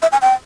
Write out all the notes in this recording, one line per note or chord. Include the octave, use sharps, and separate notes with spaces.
E5
G#5
G5